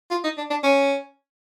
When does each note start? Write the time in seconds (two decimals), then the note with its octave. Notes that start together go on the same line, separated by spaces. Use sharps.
0.11 F4
0.24 D#4
0.38 D4
0.50 D4
0.64 C#4